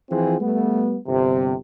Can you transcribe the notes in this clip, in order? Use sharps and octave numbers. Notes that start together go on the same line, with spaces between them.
E3 F3 C4 F4 G#4
G3 A3 B3
G1 C3